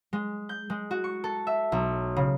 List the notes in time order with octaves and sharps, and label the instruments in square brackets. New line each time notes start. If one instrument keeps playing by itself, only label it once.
[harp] G#3
G6
G#3
F#4
C#6
A4
E5
B1
C#3